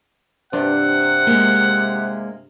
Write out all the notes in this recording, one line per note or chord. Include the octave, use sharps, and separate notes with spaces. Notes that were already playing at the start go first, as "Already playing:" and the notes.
G2 C3 D4 F4 F#5
G#3 A#3